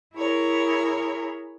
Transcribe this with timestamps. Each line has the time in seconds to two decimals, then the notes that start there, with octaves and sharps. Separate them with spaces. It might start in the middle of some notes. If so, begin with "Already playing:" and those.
0.14 E4 G#4 A#4 C#5